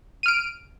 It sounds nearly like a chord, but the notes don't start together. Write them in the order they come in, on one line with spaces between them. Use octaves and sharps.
D#7 F6 D7